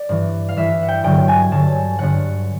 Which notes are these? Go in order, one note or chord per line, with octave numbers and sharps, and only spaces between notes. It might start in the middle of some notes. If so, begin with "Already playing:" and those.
Already playing: D5
G2 E3
F5
G2 E3 E5
F#5
G5
G2 D3 F#3 G5
G#5
G2 D3 F#3 A5
G2 D3 F#3 F#5